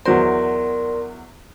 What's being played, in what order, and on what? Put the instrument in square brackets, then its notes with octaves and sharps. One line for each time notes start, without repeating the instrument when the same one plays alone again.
[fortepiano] E2 F#3 C5 [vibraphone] A#4 D5 C6